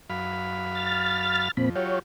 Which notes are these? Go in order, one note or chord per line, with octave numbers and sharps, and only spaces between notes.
F#2 F5 B5
F6 A6
F2 A#2 C4 B5
F#3 F4 G4 C#5